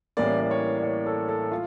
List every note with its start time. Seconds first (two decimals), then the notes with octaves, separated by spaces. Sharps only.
0.17 A1 A2 E3 G3 A#3 D5
0.40 D5
0.51 C#5
0.78 D5
0.83 C#5
1.06 A4
1.29 A4
1.52 F4